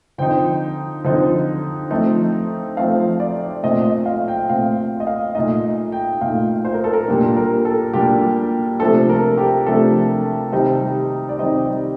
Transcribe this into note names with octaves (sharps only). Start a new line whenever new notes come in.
D3 F3 C4 D#4 G5
D3 F3 C4 D#4
F3 A3 C4 D#4
F3 A3 C4 D#4 F5
D5
A#2 A3 C4 D#5
D#5
F5
G5
A#2 A3 C4 F5
D#5
F5
A#2 A3 D#4 D#5
G5
A#2 A3 D#4 F5
C5
A#4
A4
A#4
A#2 G3 A#3 D4
A#4
A4
A#2 G3 A#3 D4 G4
C3 F3 A3 D4 A4
A#4
G4
C3 F3 A3 D4 A4
C3 D#3 G3 C4 D#4 D#5
D5
C3 D#3 G3 C4 D#4 D#5